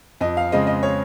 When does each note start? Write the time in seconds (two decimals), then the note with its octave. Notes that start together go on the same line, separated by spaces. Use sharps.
0.21 F2 D#5
0.37 F5
0.52 C#3 G#3 C4 D#5
0.67 D#5
0.83 C#5